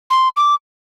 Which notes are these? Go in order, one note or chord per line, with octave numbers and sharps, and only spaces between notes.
C6
D6